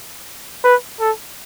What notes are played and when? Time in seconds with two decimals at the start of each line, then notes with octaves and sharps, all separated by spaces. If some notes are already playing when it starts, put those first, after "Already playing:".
0.64 B4
1.00 A4